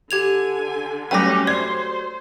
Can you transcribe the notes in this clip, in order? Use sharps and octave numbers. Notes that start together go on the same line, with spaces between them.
D3 G4 G#5 G#6 F7
F#3 G3 A3 C#4 G5 G#5 D6 A#6
C5 D5 G#6 C7